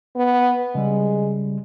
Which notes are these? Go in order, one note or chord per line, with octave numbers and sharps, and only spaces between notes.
B3
C#3 G3 G#3